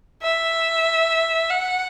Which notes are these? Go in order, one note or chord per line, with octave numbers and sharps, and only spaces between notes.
E5
F#5